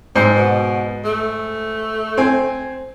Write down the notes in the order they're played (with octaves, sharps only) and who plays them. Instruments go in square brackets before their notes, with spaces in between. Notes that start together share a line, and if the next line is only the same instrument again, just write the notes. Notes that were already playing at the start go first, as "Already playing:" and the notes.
[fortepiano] G#2 [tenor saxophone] C4
[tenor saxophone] B2
A3
[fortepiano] C4 G#5